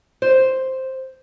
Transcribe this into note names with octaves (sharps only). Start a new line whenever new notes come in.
C5